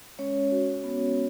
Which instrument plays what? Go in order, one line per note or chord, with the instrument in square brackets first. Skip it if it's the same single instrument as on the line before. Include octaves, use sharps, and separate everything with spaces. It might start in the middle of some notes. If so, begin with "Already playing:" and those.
[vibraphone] G#3 C#4 C#5
F#4
B3